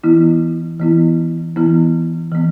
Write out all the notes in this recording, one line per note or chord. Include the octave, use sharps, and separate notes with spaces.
E3 B3 E4
E3 B3 E4
E3 B3 E4
E3 B3